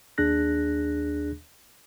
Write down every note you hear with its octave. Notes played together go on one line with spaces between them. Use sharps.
D#2 D4 G#4 F#6 A#6